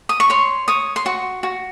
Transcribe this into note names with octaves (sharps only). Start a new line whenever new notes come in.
D#6
C#6
C#5 C6
C#5 D#6
C6
F#4 C#6
F#4